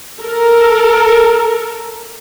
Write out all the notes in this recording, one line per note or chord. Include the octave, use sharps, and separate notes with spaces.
A4 A#4